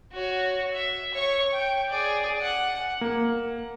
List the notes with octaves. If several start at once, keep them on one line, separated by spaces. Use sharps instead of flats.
F#4 C#5
E5
C#5 C#6
G5
G#4 D5
F#5
A#3